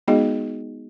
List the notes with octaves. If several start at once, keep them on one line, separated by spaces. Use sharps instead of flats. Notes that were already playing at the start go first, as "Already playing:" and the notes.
G#3 B3 D#4 F#4 G#4 D#5